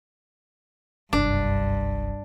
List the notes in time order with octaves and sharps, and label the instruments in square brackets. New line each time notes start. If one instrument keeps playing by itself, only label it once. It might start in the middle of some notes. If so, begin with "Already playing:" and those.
[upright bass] F#1 C2 [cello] G2 [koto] D4